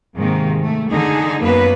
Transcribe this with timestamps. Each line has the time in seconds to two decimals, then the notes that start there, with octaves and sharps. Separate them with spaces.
0.16 G#2 C3 D#3 A#3
0.60 A3
0.90 D3 D#4 G#4
1.43 F#2 A#3 B3 B4